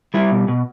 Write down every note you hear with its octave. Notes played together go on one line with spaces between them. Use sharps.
G3 E4
B2
B2